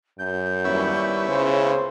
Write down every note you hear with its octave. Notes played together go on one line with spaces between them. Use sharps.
F#2 G6
D#2 G3 B3 C#4 E4
C#2 C#3 C5